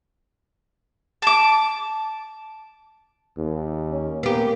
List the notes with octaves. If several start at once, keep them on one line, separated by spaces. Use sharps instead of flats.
A5 D6
D#2
C#4
A#3 B3 G4